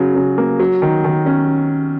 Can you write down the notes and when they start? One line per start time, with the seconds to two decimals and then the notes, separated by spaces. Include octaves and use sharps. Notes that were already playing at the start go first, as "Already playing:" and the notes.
Already playing: C#3 F#3
0.15 C#3
0.38 A#3
0.59 F#3
0.82 D#3
1.04 D#3
1.26 C#4